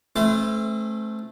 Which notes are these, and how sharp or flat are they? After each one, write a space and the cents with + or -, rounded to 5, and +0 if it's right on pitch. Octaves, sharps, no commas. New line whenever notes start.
A3 -15 C#4 -45 C5 -35